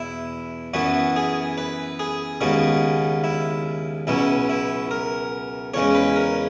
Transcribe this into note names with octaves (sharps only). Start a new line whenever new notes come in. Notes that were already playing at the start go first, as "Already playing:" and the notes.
Already playing: E2 B2 E4
F#2 E3 B3 F#4
G#4
B4
G#4
D#2 C#3 G#3 B3 F#4
E4
C#2 B2 F#3 C#4 E4
E4
A#4
E2 C#3 G#3 C#4 C#5
B4
A#4